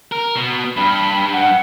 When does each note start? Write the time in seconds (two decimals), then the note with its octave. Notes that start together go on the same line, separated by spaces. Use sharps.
0.12 A#4
0.36 B2
0.77 G2 B5
1.33 F#5